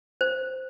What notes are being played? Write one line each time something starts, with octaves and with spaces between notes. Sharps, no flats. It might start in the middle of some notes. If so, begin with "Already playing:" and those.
C5